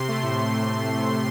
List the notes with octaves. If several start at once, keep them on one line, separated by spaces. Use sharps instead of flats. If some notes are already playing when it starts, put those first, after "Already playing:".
Already playing: C3 C6
A3
A2
A2